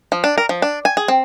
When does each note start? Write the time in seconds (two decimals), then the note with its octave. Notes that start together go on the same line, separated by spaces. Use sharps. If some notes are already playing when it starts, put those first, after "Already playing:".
0.12 F3
0.24 D4
0.38 A#4
0.49 F3
0.62 D4
0.85 G#5
0.97 G#4
1.08 C4